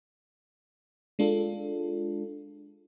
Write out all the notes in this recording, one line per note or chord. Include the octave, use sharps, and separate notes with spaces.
G#3 D4 F4 A4